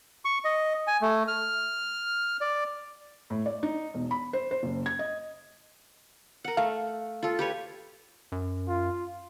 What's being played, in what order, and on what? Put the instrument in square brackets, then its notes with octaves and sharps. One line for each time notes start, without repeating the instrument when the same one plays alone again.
[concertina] C#6
D#5
G#5
A3
F6
D5
[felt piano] A2
D5
D#4
E1
B5
C5
C5
F#1
G#6
D#5
[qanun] A#4 F#5
[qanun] A3 [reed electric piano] F5
[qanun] F4 A4
G4 B4 C#5
[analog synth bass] F#2
[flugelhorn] F4